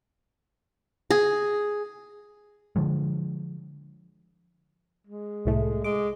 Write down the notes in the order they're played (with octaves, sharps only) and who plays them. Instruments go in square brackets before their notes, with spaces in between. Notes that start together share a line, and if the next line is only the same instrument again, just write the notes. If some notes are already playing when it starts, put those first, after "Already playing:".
[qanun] G#4
[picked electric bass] D3 F3 G#3
[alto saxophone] G#3
[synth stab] C2 A2 A3
[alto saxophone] G#3 [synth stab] D6